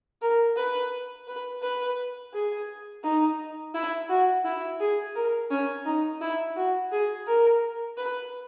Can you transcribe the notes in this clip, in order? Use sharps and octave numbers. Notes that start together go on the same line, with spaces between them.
A#4
B4
B4
B4
G#4
D#4
E4
F#4
E4
G#4
A#4
C#4
D#4
E4
F#4
G#4
A#4
B4